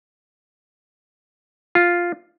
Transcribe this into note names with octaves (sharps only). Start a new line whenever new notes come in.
F4